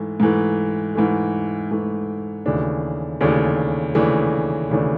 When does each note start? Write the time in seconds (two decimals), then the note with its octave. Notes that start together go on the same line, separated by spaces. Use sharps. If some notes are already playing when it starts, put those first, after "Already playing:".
Already playing: G#2 E3 A3
0.20 G#2 E3 A3
0.95 G#2 E3 A3
1.71 G#2 E3 A3
2.46 D#2 C#3 E3 A3 D4
3.21 D#2 C#3 E3 A3 D4
3.95 D#2 C#3 E3 A3 D4
4.70 D#2 C#3 E3 A3 D4